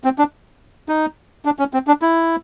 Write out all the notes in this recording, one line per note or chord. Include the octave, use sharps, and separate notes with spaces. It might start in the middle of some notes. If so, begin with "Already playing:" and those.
C4
D4
D#4
D4
C#4
C4
D4
E4